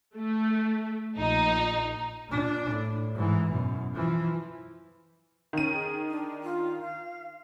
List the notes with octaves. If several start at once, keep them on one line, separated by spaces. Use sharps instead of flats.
A3
A#1 D#4
A#2 D4
A2
G#2 E3
F#2 B2
E3 F3
D#3 C#4 D#7
G#4
D4
F4
F5